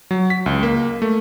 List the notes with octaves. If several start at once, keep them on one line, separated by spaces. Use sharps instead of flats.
F#3
B6
C#2
A#3
A3